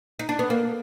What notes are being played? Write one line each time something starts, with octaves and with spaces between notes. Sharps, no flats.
D#4
D4
B3
A#3